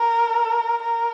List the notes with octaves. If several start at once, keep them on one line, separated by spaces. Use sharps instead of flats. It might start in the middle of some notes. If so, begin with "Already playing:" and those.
Already playing: A#4
A#4